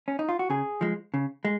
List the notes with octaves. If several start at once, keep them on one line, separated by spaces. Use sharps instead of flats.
C#4
D#4
F4
F#4
C#3 G#4
F3 G#3
C#3
G#3